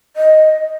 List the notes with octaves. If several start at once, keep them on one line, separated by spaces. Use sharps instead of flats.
D#5